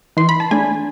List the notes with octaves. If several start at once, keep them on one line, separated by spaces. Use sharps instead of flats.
E3 C6
B5
A5
A3 D4 G#5